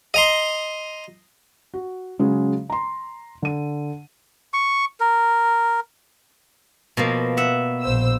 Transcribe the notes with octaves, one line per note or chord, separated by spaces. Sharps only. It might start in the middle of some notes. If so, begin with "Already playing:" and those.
D#5 A#5 C6
F#4
C#3 F#3 G#3
A#5 C6
D3 D#7
C#6
A#4
B2 F3 A#3
E5 F#5
A#1 C5 E6